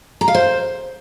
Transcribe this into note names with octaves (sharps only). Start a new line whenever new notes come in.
A#5
F5
C5